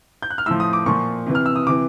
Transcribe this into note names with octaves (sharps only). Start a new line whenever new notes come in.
G6
F#6
F6
A2 F3 E6
D#6
D6
A#2 F3 C#6
C3 E3
F6
E6
D#6
C3 E3 D6